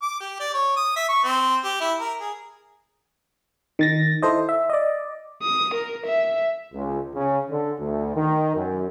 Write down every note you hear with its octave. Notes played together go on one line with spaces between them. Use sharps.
D6
G4
D5
C#5
D#6
E5
C#6
C4
G4
E4
A#4
G#4
D#3 A6 A#6
E4 A4 C5 D#5
E5
D5 D#5
D#6
A#4
E5
C#2
C#3
D3
D2
D#3
F#2